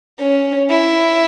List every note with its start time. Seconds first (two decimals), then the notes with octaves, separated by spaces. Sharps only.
0.20 C#4
0.70 E4